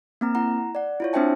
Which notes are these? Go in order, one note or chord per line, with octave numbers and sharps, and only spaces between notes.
A#3 C4 A#5
E4 F#5 A#5
D5 F#5
E4 F4 C#5
C4 D4 C5 E5 G5 A5